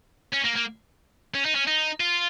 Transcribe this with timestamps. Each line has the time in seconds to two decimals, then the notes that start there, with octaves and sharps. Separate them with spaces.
0.34 C#4
0.45 A#3
0.56 A#3
1.34 C#4
1.45 D#4
1.55 C#4
1.67 D#4
2.00 F4